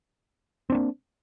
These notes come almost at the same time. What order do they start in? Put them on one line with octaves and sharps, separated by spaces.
C4 D4 A#3